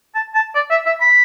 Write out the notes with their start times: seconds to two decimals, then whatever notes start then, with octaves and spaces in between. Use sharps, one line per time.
0.15 A5
0.34 A5
0.55 D5
0.70 E5
0.86 E5
1.01 B5